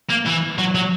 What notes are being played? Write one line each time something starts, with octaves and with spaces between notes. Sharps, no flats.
A#3
E3
F#3
F#3